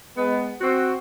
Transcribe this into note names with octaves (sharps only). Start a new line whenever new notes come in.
G#3 B3
C4 F#4